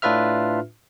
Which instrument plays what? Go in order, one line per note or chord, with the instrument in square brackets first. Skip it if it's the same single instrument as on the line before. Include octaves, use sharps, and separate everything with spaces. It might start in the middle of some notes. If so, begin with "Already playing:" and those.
[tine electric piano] A2 D4 F4 B4 E5 F6